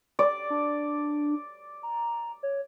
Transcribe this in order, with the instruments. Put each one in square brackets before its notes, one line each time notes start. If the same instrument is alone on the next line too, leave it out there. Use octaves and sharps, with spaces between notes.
[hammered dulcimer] D5
[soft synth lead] D4
A#5
C#5